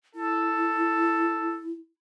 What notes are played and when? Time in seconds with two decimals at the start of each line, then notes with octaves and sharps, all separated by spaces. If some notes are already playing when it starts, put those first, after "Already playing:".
0.15 E4 A4